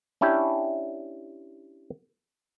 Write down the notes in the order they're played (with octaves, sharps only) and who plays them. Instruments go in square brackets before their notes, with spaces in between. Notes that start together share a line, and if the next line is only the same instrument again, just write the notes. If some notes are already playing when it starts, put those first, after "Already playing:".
[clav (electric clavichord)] C#4 D4 E4 G4